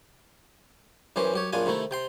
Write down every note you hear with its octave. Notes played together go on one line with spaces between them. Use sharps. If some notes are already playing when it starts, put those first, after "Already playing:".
F#2 E3 C#4 G4 C5
F#2 G4 C#5
A#1 F#2 D4 F4 G#5
C3 D#3 A3 E4
C3 G5 C6